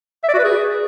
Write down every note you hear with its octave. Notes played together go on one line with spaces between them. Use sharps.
E5
D5
F#4
B4
G#4